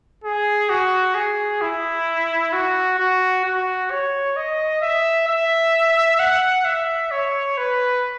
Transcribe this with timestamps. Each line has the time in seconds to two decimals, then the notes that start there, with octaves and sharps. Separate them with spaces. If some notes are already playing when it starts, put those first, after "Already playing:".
0.24 G#4
0.70 F#4
1.15 G#4
1.62 E4
2.53 F#4
2.98 F#4
3.45 F#4
3.91 C#5
4.37 D#5
4.82 E5
5.28 E5
6.20 F#5
6.65 E5
7.12 C#5
7.58 B4